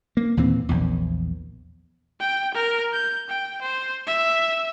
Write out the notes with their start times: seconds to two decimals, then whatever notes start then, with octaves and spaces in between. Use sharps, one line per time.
0.17 A#3
0.37 D#2 A#2 E3 C4
0.69 A#1 E2
2.20 G5
2.54 A#4
2.92 G6
3.29 G5
3.62 C5
4.07 E5